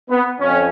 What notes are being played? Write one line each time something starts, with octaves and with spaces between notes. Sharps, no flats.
B3
F2 C#4